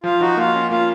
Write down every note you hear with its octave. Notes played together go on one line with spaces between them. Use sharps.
F3 F4
F3 D#4 F#4
A#3 F4
C#4
A#3 F4